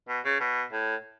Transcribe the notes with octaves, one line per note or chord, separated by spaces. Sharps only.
B2
C#3
B2
A2